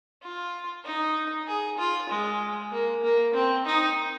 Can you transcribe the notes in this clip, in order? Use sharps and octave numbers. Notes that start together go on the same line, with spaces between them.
F4
D#4
G#4
F4
G#3
A#3
A#3
C4
D#4